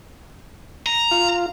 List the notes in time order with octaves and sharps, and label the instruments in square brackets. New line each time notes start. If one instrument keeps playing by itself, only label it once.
[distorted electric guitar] A#5
[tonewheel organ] F4